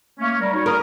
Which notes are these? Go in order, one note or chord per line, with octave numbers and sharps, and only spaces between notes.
A3 A#3 C#4
G3 A#4
D#4 F#4 C#5
A#4 B5 D#6 F6